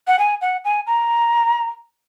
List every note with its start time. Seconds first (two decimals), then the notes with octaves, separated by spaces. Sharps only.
0.07 F#5
0.19 G#5
0.41 F#5
0.64 G#5
0.87 A#5